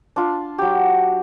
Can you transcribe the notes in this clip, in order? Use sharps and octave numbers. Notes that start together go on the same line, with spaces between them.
D4 F4
F#3 G4